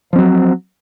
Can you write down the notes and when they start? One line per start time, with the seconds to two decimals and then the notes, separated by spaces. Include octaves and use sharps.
0.13 F3
0.16 C4
0.19 F#3